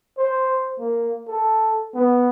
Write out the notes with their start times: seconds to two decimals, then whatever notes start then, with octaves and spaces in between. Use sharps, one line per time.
0.18 C5
0.79 A#3
1.28 A4
1.95 B3